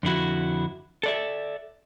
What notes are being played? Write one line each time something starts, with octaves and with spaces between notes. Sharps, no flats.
F2 D3 E4 F#4
A4 D5 E5